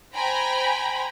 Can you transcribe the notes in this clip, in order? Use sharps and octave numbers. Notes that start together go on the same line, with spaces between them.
C5 G5 G#5 A#5 B5